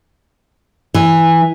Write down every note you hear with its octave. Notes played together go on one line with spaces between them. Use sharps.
E3